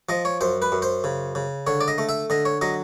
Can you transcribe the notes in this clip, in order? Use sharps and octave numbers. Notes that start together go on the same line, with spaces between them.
F3 D#5
C#5
F#2 C5
B4
F#2
C5
C#3
C#3
D3 C#5
D5
D#5
A3
E5
D3 D#5
C#5
F#3 D#5